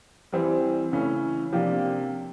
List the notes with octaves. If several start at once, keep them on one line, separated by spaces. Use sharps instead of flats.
E3 G3 C4
C#3 E3 A3 C#4
C3 F3 A#3 D4 G4